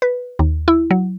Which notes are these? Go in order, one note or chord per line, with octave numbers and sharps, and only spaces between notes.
B4
D#2
E4
F#3